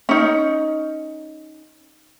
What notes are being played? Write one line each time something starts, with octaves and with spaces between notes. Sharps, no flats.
C#4 D#4